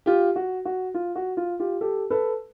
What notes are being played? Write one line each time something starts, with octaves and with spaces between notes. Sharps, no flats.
F4 G4
F#4
F#4
F4
F#4
F4
F4 G4
G4 A4
A4 B4